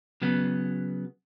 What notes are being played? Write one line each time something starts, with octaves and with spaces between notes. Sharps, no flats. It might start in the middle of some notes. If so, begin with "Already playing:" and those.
C#3 F#3 B3